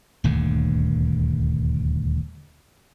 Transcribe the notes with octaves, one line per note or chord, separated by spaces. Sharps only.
D#1 D2 G2 D3